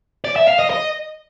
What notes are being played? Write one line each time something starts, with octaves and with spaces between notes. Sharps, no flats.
D5
E5
F5
D#5
D#5